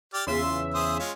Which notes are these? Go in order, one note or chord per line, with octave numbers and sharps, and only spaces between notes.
G4 D5 F6
E2 C#3 F4 E5 C6
G#4 C5 D#6
G#3 C#4 F4